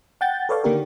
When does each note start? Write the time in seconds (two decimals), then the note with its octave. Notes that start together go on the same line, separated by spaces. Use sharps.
0.21 F#5 G5 G6 A6
0.49 A4 B4 C#5 D5 F5
0.64 D3 D#3 A#3 D4 G4 A#4